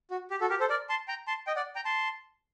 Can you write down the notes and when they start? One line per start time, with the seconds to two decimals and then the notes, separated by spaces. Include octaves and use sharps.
0.11 F#4
0.31 G4
0.41 F#4 A4
0.49 G4 A#4
0.60 A4 C5
0.69 A#4 D5
0.89 A5 C6
1.08 G5 A#5
1.27 A5 C6
1.47 D#5 G5
1.56 D5 F#5
1.75 G5 A#5
1.85 A5 C6